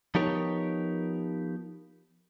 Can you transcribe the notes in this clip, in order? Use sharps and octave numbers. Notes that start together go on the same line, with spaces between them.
F3 B3 D#4 G4 A#4 C#5